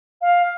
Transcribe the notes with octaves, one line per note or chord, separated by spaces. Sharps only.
F5